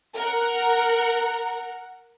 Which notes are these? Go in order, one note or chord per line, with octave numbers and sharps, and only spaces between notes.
A#4 F#5